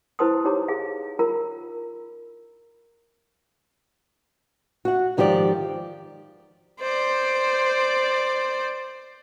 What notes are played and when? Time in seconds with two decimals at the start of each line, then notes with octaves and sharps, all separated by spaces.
0.19 E4 B4 C5 A5 C6 D#6
0.45 D#4 G4 C#5 A#5 D6
0.68 G#4 F5
1.19 F4 A#4 A#5 B5
4.85 F#4 F#5
5.17 G#2 D#3 F3 G4 G#4 D5
6.80 C5 D5